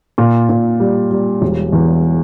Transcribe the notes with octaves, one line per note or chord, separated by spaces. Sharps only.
A#2
A#2
G3
G3
E1
E2